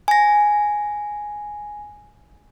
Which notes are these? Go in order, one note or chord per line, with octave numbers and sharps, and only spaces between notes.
G#5 A#6